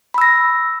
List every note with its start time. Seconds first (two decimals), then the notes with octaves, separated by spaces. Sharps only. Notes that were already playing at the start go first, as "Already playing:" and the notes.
0.14 B5
0.18 E6
0.21 A#6